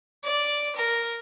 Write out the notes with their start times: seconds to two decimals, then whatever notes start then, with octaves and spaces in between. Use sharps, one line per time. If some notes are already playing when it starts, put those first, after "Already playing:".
0.24 D5
0.76 A#4